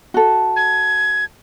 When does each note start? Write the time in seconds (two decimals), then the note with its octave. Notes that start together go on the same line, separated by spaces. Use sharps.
0.14 F#4 A4
0.56 G#6